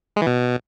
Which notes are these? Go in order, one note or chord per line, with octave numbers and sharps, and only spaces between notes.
G#3
E3
B2